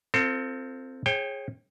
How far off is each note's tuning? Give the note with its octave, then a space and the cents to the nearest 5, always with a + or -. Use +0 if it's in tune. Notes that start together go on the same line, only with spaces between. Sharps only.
C4 +0 F4 +0 A4 +30
G#4 +0 C#5 -35 G5 +10